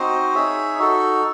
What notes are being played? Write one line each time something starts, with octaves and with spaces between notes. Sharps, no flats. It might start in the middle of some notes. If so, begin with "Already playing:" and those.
Already playing: C4 D#4 F#4 C5 D#5
D#4 G#4 C#5 E5
D#4 F#4 A4